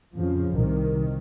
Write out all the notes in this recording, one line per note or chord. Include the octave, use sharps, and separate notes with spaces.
F2 C#3 F3
C2 C3 D#3